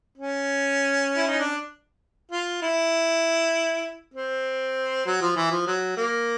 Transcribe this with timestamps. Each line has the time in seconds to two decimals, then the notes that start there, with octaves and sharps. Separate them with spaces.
0.18 C#4
1.17 E4
1.28 D#4
1.40 D4
2.32 F4
2.62 E4
4.14 C4
5.06 F#3
5.22 F3
5.36 E3
5.51 F3
5.67 F#3
5.97 A#3